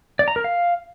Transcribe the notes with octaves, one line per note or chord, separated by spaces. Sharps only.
D5
A#5
A#4
F5